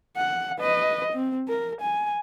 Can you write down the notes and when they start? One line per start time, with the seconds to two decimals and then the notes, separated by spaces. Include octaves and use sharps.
0.17 F#5
0.60 B4 D#5
1.13 C4
1.49 A#4
1.81 G#5